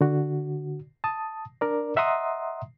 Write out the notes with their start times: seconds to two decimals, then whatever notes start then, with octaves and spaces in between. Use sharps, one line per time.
0.01 D3 F#4
1.04 A5 D#6
1.61 D4 A#4 D5
1.96 D#5 E5 F#5 A#5 C6 D#6